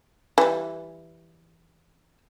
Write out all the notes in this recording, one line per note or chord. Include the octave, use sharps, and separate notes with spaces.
E3 G3